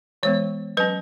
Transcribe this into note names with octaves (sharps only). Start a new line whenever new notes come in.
E3 G#3 B3 C#5
F#3 C#4 B4